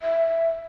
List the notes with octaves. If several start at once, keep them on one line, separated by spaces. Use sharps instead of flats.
E5